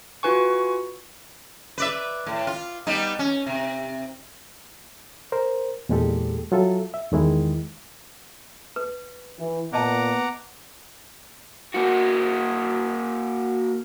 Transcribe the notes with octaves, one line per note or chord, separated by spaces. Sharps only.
F4 F#4 B4 G#5 C#6
B4 D5 E5
A2
F4
G3 B3 D#4
C#4
C3
A#4 C5
E2 A#2 G#3 G4 A4
F#3 F4 A4 E5
E5
E2 D#3 G#3 E4
B4
E3 E4
A#2 B3 D5 D#5 F#5 A5 A#5 D6
A#3 F#4